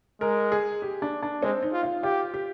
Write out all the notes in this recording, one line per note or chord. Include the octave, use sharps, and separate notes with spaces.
G#3 A#4
G#4
G4
D4
D4
G#3 C4
D#4
F4
F4
F4 G4
G4